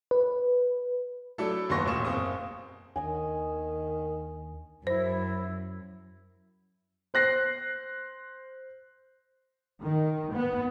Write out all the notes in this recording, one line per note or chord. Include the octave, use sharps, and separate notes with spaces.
B4
F#3 A3 D4 E4 A4
F#1 D#2 B3 C6 C#6 A#6
E1 A1 A#2 C#6 E7
F#1 C4 C#6 D#6
D#2 D#3 D4 D#5 G#5
F#2 E4 C5
C5 F#6 A#6 C7
D#3
B3